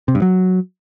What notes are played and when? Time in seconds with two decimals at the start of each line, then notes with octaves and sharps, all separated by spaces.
0.08 C3
0.15 G2
0.22 F#3